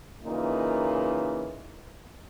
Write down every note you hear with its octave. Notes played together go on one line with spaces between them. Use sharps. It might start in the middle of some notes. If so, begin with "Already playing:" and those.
A#2 C#3 E3 A#3 D#4 F4